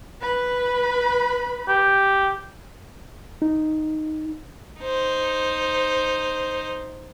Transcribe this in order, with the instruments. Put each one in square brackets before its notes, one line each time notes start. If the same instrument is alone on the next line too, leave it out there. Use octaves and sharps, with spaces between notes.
[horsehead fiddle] B4 B5
[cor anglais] G4
[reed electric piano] D#4
[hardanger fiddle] D#4 C5